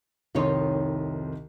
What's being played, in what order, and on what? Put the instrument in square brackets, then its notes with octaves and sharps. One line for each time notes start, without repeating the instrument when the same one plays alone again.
[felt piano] C2 D#3 C6 [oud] F2 D#4 C#5